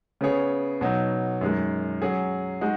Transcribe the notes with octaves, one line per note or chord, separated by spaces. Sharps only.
C#3 B3 G#4 C#5
B2 F#3 D#4
F#2 D#3 G#3
F#3 C#4 G#4
G#3 D#4 F#4